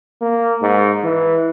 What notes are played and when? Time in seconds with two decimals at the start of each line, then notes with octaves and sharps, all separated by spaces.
0.21 A#3
0.62 G#2
1.04 E3